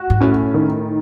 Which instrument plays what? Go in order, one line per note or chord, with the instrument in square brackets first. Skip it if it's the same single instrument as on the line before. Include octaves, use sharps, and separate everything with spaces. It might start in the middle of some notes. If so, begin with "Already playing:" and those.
Already playing: [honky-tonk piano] F#4
[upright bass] G#2
[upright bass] A2 [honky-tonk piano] C#4
[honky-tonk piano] D#3